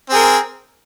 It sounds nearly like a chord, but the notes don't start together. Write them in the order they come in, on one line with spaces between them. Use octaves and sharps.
C4 G#4 A#4